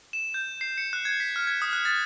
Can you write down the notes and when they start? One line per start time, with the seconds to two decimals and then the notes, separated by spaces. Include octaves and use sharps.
0.13 E7
0.34 G6
0.61 C7
0.78 C#7
0.93 F#6
1.05 G#6
1.20 B6
1.36 F6
1.47 G#6
1.62 D#6
1.73 F#6
1.85 A6